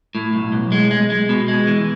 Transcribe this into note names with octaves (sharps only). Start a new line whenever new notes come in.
A2
B1
B1
G#3
G#3
G#3
B2
G#3
E3